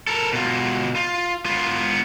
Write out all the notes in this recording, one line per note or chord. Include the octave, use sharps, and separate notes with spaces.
A4 A#4
B2 F4
F4
B3 F4